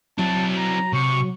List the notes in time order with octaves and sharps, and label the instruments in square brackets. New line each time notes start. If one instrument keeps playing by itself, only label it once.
[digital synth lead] F#3 [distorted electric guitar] C4 E4 [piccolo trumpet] A5
[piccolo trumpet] A#5
[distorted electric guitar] C3 [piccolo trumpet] C#6